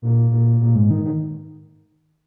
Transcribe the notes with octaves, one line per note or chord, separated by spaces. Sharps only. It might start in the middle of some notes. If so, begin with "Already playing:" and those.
A#2
A#2
A#2
G#2
D#3
D#3